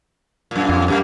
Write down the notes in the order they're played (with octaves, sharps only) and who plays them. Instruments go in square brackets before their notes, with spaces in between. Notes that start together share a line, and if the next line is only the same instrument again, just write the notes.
[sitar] F#2 A#2
[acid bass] F2
[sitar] F#2 G3 A#3